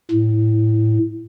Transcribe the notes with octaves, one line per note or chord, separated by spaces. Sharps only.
A2